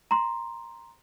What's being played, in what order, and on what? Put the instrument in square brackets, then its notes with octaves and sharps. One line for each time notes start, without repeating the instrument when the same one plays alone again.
[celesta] A#5 C6